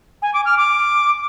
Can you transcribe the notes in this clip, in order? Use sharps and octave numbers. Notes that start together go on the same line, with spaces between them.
G#5
D6
F6
D6